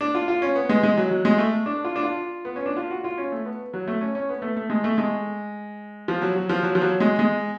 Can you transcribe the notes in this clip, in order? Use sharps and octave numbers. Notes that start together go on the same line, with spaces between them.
D4
F4
F4
C#4
B3
G#3
G#3
F#3
F#3
G#3
A3
D4
F4
D4
F4
B3
C#4
D4
F4
F#4
F4
C#4
A3
B3
F#3
A3
C#4
C#4
B3
A3
A3
G#3
A3
G#3
F3
F#3
F#3
F3
F#3
F3
F#3
G#3
G#3